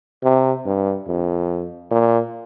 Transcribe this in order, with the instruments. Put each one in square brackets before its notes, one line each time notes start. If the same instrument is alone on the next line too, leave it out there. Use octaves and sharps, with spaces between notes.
[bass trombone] C3
G2
F2
A#2